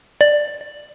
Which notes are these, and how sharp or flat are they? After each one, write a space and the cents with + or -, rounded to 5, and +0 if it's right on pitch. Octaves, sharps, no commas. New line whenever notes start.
D5 +10